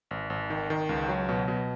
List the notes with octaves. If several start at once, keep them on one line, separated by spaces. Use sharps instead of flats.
G#1
G#1
D#3
D#3
C#2
F#3
B2
B2